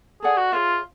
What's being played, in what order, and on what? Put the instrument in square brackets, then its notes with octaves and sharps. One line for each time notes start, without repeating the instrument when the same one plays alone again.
[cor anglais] G#4 [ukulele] A4 D5 F#5
[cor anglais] F#4
[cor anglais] F4 [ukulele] G#4 C#5 E5